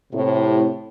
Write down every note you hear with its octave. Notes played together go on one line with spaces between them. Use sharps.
A2 C3